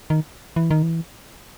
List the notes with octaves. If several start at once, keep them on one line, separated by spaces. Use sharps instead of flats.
D#3
E3
D#3
E3